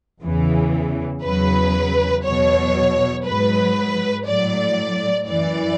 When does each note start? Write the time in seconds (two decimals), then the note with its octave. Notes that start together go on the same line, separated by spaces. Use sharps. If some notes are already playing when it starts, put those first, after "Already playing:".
0.22 E2 C#3 E3
1.23 E2 C#3 F#3 B4
2.24 E2 B2 F#3 C#5
3.25 G#2 F#3 B4
4.26 A2 F#3 D5
5.26 F#2 E3 D5